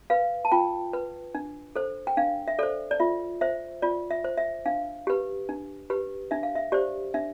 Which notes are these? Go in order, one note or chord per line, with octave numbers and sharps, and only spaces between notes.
B4 F5
A5
F4 G5
B4
D4
A4 C5
G5
D4 F5
E5
A4 C5 D5
D5
F4 E5
C5 E5
F4 D5
E5
C5
E5
D4 F5
G4 B4
D4
G4 B4
D4 E5
F5
E5
G4 C5 D5
D4 E5